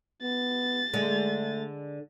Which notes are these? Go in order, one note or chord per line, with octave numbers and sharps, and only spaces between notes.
B3 A6
D3 G#3 A3